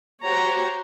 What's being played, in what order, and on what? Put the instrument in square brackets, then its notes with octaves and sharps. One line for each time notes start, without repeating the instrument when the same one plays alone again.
[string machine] F#4 G4 C5 [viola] C#5 A#5